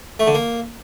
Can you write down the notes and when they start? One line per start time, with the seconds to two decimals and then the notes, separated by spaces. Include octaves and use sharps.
0.20 A3
0.27 D3
0.35 A#3